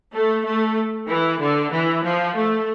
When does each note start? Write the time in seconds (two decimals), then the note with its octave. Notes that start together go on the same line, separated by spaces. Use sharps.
0.13 A3
0.44 A3
1.08 E3
1.40 D3
1.71 E3
2.03 F3
2.35 A3